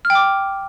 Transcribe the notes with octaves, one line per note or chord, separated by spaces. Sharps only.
F6
G5
D6